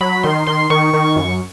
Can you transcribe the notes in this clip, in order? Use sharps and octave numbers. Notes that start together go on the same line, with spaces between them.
F#3 B5
D#3 C6
D#3 C6
D#3 C#6
D#3
F#2